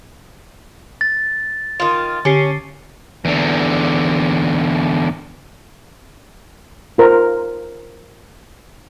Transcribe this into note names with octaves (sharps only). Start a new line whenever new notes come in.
A6
D#3 F4
D3 C#4 G4 C7
E2 D3
F4 A#4 C5